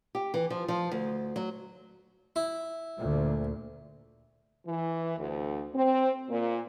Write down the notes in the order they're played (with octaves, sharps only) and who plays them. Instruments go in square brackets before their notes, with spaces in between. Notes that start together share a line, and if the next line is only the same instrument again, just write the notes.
[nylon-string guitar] G4
E3
F3
F3
D2
F#3
[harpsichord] E4
[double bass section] D2 A#2
[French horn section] E3
D2
C4
A#2